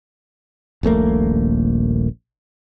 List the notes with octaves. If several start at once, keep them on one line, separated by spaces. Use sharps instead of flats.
D#1 A#1 A3 A#3